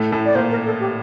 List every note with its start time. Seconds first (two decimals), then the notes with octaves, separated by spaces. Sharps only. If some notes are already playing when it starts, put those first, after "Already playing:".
Already playing: A2 A3
0.12 A2 A3
0.25 D5
0.35 A#2 A#3 C5
0.51 A#4
0.66 A4
0.80 G4